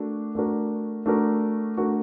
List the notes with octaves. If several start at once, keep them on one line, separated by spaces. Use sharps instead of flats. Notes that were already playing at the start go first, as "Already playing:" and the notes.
Already playing: A3 D4 F#4 A#4
A3 D4 F#4 A#4
A3 D4 F#4 A#4
A3 D4 F#4 A#4